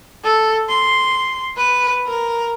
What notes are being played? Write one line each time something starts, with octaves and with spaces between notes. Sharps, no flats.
A4
C6
B4
A#4